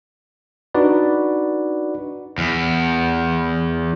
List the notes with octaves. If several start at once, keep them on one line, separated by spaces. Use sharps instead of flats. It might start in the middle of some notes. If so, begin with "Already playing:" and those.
D4 D#4 F#4 B4 D5
E2